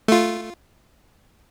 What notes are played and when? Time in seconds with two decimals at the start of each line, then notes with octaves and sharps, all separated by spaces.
0.08 A3 F4